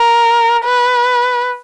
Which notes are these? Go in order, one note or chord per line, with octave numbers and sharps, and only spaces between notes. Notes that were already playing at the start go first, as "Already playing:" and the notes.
Already playing: A#4
B4